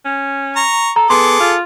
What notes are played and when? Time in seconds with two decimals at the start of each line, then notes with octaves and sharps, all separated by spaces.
0.05 C#4
0.56 A#5 C#6
0.96 A4 A#5
1.10 B3 G#4 A4 C6 D6
1.40 F4